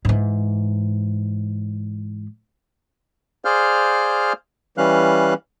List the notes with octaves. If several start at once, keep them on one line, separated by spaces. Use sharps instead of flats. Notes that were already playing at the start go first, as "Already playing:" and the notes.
G#2 E3
G#4 C5 D5 F5 F6 G6
E3 G3 C#4 F5 F#6